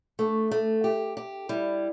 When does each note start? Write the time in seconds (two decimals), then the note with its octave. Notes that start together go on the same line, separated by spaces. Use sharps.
0.19 A3 D4
0.51 A3
0.84 G4
1.17 G4
1.49 G3 E4